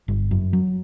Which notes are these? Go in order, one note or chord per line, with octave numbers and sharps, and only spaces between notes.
G1
F#2
F#3